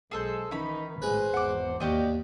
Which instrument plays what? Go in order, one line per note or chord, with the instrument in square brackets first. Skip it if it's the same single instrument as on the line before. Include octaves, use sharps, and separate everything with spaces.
[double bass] B1 [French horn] G#3 [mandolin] G#4 A4 C5
[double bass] D#3 E3 [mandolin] C#4 B5 [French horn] D#4
[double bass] G#1 A2 [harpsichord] G#3 B4 [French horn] C5
[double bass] G#1 E2 [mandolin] F#5 D6
[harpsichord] D#2 [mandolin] F#4 G4 D#5 [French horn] D5